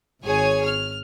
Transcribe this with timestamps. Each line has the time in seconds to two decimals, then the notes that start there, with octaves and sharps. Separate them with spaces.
0.24 G#1 G#4 C#5 G#5
0.65 F6